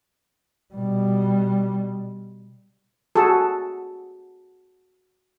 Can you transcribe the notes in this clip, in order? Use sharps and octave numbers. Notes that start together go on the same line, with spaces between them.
B2 G3
F#4 G#4 A4